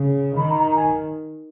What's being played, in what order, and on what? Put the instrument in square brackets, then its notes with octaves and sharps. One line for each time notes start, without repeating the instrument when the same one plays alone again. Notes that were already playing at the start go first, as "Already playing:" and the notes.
Already playing: [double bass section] C#3
[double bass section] D#3 [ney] B5
[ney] A#5
A#5
G#5